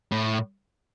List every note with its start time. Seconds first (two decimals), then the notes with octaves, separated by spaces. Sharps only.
0.11 A2